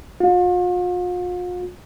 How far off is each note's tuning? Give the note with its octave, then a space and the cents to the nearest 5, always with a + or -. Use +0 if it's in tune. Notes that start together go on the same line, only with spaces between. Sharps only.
F4 +45